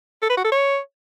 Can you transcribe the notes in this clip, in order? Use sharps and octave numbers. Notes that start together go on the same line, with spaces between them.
A4
B4
F#4
A4
C#5